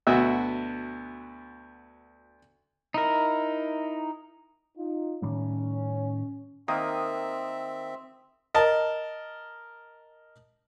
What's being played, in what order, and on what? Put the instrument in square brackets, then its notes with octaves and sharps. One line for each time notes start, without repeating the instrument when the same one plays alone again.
[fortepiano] D2 B2 F#4 E5
[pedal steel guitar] D#4 E4 A#4
[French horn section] D#4 F4
[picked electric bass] A2 D#3 G3 [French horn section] C#4
[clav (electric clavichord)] D#3 A#3 [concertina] C4 E5 [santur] D#6
[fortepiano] A#4 D#5 A5